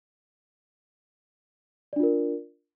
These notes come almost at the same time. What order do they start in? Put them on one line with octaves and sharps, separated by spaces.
D5 D4 F4 A#4